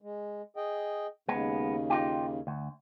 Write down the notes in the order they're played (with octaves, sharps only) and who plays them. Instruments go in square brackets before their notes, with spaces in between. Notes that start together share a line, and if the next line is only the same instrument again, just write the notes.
[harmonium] G#3
G#4 D#5 G5
[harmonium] D#2 C#3 [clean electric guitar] G#3 B3
[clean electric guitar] D#4 F4 G4
D2